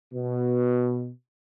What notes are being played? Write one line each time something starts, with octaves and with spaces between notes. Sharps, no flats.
B2